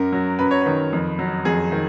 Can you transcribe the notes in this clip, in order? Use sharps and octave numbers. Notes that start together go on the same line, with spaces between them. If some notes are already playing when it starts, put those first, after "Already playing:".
Already playing: F#2 A#4
F#3
F#2 B4
C#5
D#3 B4
F2
F#3
F2 G#4
D#3